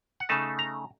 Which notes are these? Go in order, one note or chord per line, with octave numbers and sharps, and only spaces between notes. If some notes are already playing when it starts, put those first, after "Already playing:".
F#5
C#3 A3 D#4 A5
A#5